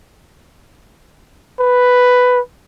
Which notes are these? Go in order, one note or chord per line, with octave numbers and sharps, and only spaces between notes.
B4